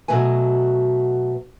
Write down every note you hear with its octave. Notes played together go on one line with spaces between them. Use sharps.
B2 F#3 A3 B4 G#5